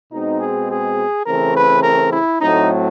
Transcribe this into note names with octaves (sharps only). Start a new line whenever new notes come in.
B2 G#3 C4 D#4
G#4
G#4
C#3 E3 A3 C4 A#4
B4
A#4
E4
A2 F#3 A3 C4 D#4